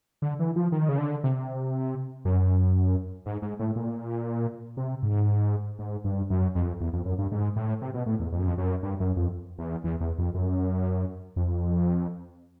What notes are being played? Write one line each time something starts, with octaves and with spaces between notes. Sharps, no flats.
D3
E3
F3
D#3
C#3
D3
C3
F#2
G#2
G#2
A2
A#2
C3
G#2
G#2
G2
F#2
F2
E2
F2
F#2
G2
G#2
A2
C3
B2
A2
E2
F2
F#2
F2
F#2
G2
F#2
F2
E2
E2
E2
F2
F#2
F2